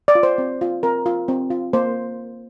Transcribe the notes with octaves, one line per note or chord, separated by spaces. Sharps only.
D5
F4
C5
C4
F4
C4 A#4
F4
C4
F4
A#3 C5